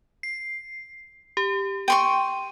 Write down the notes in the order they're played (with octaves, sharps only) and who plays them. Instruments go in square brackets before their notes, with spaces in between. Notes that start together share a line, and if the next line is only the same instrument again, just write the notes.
[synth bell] C7
G4
[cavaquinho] G5 C6 C#6 [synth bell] D#7